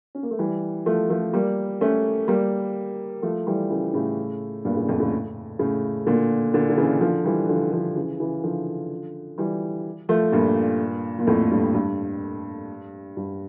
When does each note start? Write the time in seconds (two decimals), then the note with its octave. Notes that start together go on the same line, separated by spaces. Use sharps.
0.15 C#4
0.23 A#3
0.31 A3
0.39 E3 G3
0.86 F3 A3
1.10 F3 A3
1.33 G3 A#3
1.81 A3 C#4
2.28 G3 A#3
3.22 F3 A3
3.47 E3 G3
3.70 C#3 E3
3.94 A2 C#3
4.65 G2 A#2
4.77 A2 C#3
4.89 F2 A2
5.00 A2 C#3
5.59 A2 C#3
6.06 A#2 D3
6.54 A#2 D3
6.70 D3
6.77 C#3 E3
7.01 D3 F3
7.25 E3 G3
7.49 D3 F3
7.72 D3 F3
7.96 C#3 E3
8.20 C#3 E3
8.44 D3 F3
9.38 E3 G3
10.09 F3 A3
10.32 G2 A#2
11.19 A#2
11.27 F2 A2
11.51 G2
11.74 G2
13.17 G2